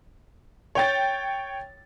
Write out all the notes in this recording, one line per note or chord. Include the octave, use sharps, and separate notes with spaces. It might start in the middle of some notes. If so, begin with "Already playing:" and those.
C#5 G5 A6